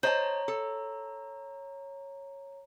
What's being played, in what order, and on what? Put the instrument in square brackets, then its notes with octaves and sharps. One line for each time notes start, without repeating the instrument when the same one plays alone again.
[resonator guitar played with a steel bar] C5 D#5 A5 [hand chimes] C#5 A#5
[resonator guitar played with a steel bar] A4